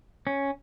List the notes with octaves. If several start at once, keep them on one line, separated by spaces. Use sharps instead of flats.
C#4